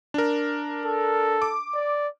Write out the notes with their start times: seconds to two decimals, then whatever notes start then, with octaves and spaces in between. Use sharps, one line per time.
0.14 D4 A#4
0.86 A4
1.42 D6
1.75 D5